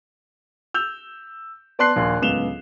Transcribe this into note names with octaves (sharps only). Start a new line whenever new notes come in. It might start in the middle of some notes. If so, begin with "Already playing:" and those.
E6 G6 F7
B3 D5 A5 C6 F#6 C7
A#1 D#2 C6
D1 C#2 B3 E7 F7 G7